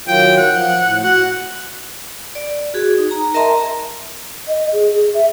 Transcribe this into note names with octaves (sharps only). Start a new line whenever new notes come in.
D#3 F#3 F4 G5
F#5
F3
A2
F#4 F#5
D5
F#4 G#4
D#4
A#5
A#4 D#5 E5 A5 A#5 C6
D#5
G#4
G#4
E5